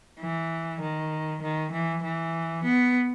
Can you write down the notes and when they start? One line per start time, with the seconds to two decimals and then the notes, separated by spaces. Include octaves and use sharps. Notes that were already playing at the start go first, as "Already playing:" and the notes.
0.20 E3
0.82 D#3
1.42 D#3
1.73 E3
2.04 E3
2.64 B3